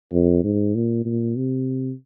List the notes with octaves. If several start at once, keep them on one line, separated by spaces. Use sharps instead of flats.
F2
G#2
A#2
A#2
C3